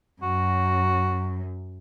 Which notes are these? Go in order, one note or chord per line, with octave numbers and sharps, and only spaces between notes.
F#2 F#4